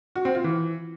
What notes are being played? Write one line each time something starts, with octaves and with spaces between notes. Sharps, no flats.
F#4
C4
F4
E3